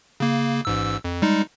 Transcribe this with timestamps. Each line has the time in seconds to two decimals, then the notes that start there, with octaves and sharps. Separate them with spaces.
0.20 C#3 A#3
0.65 A1 G#2 E6
1.04 F2
1.22 G3 G#3 D#4